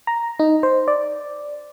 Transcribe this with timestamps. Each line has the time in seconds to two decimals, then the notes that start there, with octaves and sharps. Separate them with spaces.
0.07 A#5
0.39 D#4
0.63 C5
0.88 D5